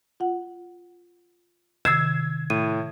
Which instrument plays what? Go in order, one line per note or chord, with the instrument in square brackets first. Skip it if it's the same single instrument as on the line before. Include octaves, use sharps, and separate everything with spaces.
[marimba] F4 F#5
[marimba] C3 D#3 A6 [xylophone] E6 C7 E7 [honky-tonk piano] G#6
[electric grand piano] A2 [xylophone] D#7